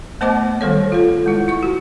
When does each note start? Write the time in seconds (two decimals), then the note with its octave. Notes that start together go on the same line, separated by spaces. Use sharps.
0.21 A3 B3 C5 D#5 A5 D6
0.61 D#3 G3 A4 C#5
0.92 F4 A4
1.26 G#3 E4
1.48 E4 C#6
1.63 F#4